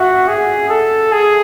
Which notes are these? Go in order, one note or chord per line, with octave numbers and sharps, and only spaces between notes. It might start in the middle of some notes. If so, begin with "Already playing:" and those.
Already playing: F#4 E5 F#5
G#4
A4
G#4